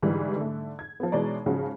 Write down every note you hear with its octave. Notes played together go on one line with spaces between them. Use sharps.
G#2 D3 E3 G3
D3 A3
G#6
F3 B3
B2 E3 G#3 C#5 D5 A#5
G#2 C#3 F3 F#4